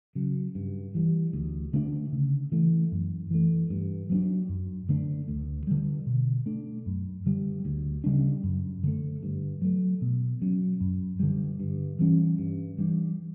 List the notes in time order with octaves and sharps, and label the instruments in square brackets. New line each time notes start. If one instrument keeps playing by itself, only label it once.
[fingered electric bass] C#3 F#3
G2
E3 G3
D2
D3 A3 D4
C#3
E3 A3
F#2
E3 A3
G2
F#3 B3
D4
F#2
D3 A3 D4
D2
D3 G3
B2
A3 D4
F#2
D3 G3
D2
C#3 G3 D4
F#2
D3 A3
G2
F#3 A3
B2
F#3 C#4
F#2
D3 G3
G2
E3 G3 C#4
G2
E3 G3 D4